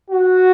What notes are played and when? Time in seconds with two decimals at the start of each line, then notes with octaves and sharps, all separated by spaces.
0.10 F#4